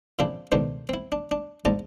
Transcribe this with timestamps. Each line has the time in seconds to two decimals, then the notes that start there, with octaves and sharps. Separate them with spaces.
0.19 A#2 C#3 F3 C4 D4 E4
0.52 C#2 B2 D#3 A3 D4 C5
0.89 C4 E4
1.12 D4
1.31 D4
1.65 A#1 G#2 D5 A5 A#5